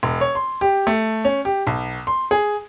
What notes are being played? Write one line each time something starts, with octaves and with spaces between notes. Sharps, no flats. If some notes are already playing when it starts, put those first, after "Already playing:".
E1
C#5
C6
G4
A3
C#4
G4
B1
C6
G#4